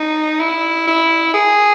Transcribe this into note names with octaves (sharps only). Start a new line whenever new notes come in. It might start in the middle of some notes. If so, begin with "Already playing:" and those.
Already playing: D#4
E4
E4
G#4